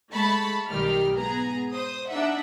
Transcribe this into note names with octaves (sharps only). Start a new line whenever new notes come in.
G#3 A3 A5 B5 C#6
B1 D#3 G3 G4 F6
G#2 B3 G#4 A#5
C5 D#6
D4 D#4 E5 F#5